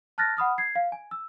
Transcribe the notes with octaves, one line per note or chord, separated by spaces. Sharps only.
A5 F6 F#6 A6 A#6
F#5 B5 D#6 F6
G#6 C7
F5
G#5
E6